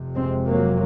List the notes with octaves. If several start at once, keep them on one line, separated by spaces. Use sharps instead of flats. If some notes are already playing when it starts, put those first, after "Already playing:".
Already playing: F1 F2 C3
G#3 C4
F#3 A#3